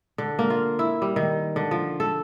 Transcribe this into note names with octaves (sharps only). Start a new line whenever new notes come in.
D3
A#3
F4
E4
G3
D#3
D3
F3
A4